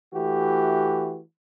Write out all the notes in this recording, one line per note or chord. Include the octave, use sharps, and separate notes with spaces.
E3 A3 F#4 G4